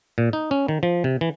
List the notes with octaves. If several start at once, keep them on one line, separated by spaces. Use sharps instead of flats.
A#2
D#4
C#4
D#3
F3
C3
E3